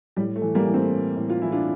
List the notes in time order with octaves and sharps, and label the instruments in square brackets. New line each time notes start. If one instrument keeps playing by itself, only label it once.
[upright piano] A2 G3
A3
E3
G3 A#3
E3
A3 C4
A2
A2
F4
E3 E4
D4 F4